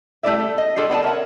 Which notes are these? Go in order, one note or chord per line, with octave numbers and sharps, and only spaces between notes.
G3 A3 E4 A#4 D5 E5
A4
D#5
G3 D4 F4 G#4 A4
B3 D5 G5 A5
A#4 C#5 E5 F#5